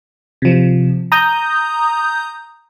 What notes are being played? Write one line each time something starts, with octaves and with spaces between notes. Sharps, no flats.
C3 F3
A#5 D#6 G6